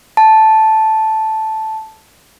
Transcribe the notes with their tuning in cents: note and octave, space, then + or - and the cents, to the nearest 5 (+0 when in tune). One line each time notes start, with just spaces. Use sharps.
A5 -5